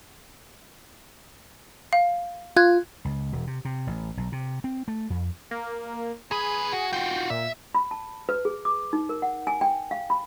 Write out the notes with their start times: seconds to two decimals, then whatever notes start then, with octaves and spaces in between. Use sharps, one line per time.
1.93 F5
2.56 F4 F#6 G#6
3.05 C#2
3.32 E1
3.47 C3
3.65 C3
3.87 A1
4.17 B1
4.32 C3
4.64 C4
4.88 A3
5.10 F2
5.51 A#3
6.31 F#2 G#4 B4
6.73 F#4
6.93 F4 F#4 G5
7.30 A#2 E5
7.75 B5
7.91 A5
8.29 B4
8.45 G#4
8.65 D6
8.93 D#4
9.09 A#4
9.22 F#5
9.47 G#5
9.61 G5
9.91 F5
10.10 B5